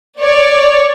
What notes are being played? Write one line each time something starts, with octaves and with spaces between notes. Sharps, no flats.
C#5 D5